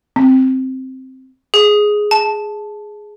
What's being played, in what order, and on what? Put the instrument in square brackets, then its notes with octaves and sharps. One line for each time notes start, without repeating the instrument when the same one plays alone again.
[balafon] C4
[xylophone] G#4
A5